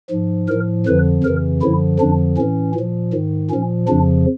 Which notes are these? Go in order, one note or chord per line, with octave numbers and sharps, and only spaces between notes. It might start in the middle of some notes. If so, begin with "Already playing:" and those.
G#2 F3
A2 F3 A#4
F2 D3 F3 B4
F2 C#3 E3 A#4
F#2 D3 F3 E4
F2 D3 F3 D4
A2 E3 C#4
A#2
F3
G#2 D#3
A#2 F3 C#4
F2 C#3 F3 D4